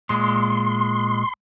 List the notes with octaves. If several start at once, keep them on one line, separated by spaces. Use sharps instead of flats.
A#2 G#3 C6